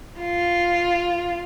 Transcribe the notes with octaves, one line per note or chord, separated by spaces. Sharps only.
F4